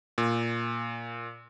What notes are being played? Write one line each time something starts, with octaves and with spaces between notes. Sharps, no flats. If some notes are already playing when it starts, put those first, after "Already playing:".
A#2